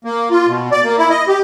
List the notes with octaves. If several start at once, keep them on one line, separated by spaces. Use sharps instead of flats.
A#3
F4
B2
D5
A#3
E4
D#5
G4